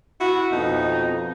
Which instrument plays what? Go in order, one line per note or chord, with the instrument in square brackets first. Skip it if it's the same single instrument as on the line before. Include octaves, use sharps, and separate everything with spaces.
[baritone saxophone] E4 [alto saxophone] F#4
[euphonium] F2 [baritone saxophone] B2 [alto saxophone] D#4